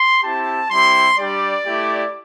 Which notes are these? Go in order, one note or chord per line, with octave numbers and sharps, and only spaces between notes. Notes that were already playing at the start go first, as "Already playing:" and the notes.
Already playing: C6
C4 E4 G4 A5
G3 C4 E4 G4 C6
G3 D4 G4 D5
A3 E4 G4